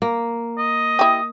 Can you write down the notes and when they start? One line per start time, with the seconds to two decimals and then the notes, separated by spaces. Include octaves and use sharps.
0.02 A#3
0.58 D#5
0.99 E4 G4 D#6